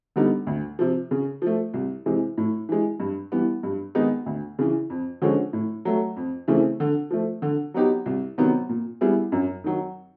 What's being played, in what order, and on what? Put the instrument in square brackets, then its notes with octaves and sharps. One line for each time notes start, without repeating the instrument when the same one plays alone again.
[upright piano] D3 G3 B3 D#4
D2
C3 F3
C#3
F3 A3
C2
C3 E3 G#3
A2
E3 G#3
G2
E3 G3 B3
G2
D#3 G#3 B3 D#4
D2
C#3 E3
F2
D3 F3 G#3 C#4
A2
F#3 A3
F2
C#3 E3 A3 C4
D3
F3 A3
D3
F#3 B3 D#4 G4
C2
C3 D#3 F#3 B3
A#2
G3 B3 E4 G#4
F#2
D#3 F#3